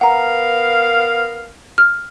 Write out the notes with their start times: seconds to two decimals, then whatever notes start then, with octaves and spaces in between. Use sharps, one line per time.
0.01 B3 A#4 F5 F#5 A#5
1.78 F6